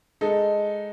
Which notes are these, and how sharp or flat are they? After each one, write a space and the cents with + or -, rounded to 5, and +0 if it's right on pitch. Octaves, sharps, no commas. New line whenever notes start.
G#3 +0 D#4 +0 A4 +0